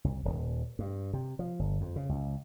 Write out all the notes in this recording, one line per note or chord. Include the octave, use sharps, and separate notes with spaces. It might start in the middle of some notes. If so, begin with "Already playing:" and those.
C2
D#1
G2
C3
F3
G1
F2
C#3
C#2